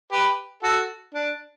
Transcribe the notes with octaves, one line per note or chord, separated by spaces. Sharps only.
G4 B4
F#4 A4
D4